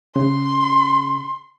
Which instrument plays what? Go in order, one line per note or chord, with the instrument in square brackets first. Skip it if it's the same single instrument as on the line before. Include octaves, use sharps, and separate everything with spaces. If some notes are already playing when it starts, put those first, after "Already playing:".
[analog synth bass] C#3 [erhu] C6